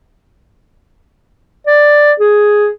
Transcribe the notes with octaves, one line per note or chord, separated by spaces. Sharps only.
D5
G#4